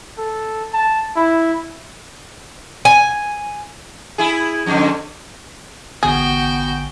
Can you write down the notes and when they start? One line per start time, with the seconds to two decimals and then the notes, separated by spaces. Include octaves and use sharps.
0.18 A4
0.73 A5
1.16 E4
2.85 G#5
4.18 E4 G#4
4.66 F2 G#2 D3
6.03 A1 D3 B3 F#4 G#4 G5 G#5